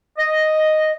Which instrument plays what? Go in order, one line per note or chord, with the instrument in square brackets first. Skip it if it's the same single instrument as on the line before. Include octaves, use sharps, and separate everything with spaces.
[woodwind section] D#5